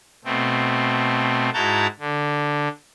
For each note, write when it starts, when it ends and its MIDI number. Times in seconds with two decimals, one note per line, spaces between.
0.25 1.50 47
0.25 1.50 57
0.25 1.50 60
1.54 1.87 44
1.54 1.87 64
1.54 1.87 66
1.54 1.87 81
1.54 1.87 82
1.54 1.87 91
1.99 2.68 50